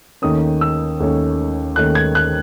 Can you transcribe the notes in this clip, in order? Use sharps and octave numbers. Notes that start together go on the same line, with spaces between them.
D#2 D#3 A3 C#4 D#6
E6
D#2 D#3 A3 C#4
D#2 D#3 A3 C#4 F#6
G#6
F#6